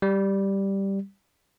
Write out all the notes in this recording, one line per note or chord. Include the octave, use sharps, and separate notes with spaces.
G3